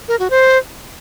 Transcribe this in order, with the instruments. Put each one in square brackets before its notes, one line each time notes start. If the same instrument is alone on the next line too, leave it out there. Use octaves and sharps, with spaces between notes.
[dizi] A#4
F#4
C5